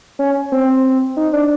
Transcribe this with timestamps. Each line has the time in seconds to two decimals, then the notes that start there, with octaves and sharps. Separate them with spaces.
0.19 C#4
0.52 C4
1.17 D#4
1.33 D4